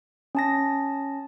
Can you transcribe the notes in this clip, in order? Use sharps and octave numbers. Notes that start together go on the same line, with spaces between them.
C#4 A5 A#6